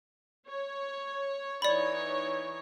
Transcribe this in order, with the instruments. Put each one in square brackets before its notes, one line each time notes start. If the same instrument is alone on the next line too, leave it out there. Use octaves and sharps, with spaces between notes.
[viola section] C#5
[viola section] E3 D#4 C#5 [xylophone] D5 B5